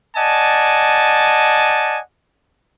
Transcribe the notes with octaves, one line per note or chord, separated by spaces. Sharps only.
D5 D#5 F#5 G#5 A5